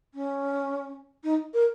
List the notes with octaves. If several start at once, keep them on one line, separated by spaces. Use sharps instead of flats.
C#4
D#4
A#4